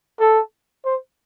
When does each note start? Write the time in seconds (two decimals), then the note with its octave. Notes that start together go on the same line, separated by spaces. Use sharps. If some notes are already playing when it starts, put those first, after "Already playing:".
0.20 A4
0.85 C5